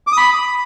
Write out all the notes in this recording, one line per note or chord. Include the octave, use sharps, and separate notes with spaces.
D6
D#6
B5